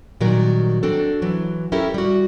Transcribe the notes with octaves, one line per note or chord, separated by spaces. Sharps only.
A#2 D#3 F#3 G3 A#4
C4 D4 F#4 A4
E3 F#3
C#4 E4 G4 A4 A#4
G3 F#4